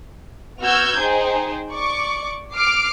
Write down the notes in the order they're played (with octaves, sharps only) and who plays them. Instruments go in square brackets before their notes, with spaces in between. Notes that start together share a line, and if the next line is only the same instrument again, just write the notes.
[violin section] B3 F#4 E6 F6 G6 G#6
D#4 G#4 C5 G5
D5 C#6 D6
D6 F6 C7 D7